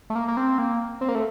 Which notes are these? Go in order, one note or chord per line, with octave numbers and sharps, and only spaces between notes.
A3
A#3
A#3
C4
A#3
C4
A#3
A3